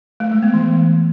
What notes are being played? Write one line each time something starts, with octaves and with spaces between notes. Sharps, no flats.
A3
G#3
B3
E3